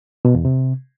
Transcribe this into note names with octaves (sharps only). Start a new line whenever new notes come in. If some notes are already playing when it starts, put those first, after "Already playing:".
B2
E2
C3